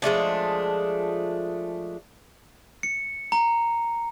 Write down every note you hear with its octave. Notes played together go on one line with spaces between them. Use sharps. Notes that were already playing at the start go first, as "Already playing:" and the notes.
F3 G#3 A3 D4
C#7
A#5